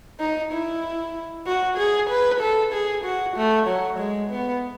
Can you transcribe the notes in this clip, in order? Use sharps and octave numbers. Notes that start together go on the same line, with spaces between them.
D#4
E4
F#4
G#4
B4
A4
G#4
F#4
A3
F#3
G#3
B3